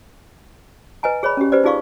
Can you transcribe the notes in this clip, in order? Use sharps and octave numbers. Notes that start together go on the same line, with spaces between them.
B4 D#5 G#5 A#5
G#4 C#5 D5 B5
C#4 G4
G4 B4 C5 D5
D#4 F4 G#4 D5 F5 C#6